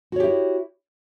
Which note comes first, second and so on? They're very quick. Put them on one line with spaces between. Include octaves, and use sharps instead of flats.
F#4 C#5 G4 E4